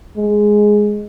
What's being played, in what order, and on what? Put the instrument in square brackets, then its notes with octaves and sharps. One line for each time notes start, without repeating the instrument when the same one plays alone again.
[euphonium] G#3